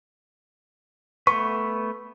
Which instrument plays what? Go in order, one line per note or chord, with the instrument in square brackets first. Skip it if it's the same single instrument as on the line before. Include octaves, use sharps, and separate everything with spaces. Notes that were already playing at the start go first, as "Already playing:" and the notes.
[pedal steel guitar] A3 B3 B4 [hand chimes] C#6